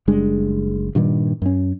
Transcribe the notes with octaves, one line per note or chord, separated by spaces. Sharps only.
F#1 G3 G#3 D4
G2 A#2 D#3 G3
F#2 C#4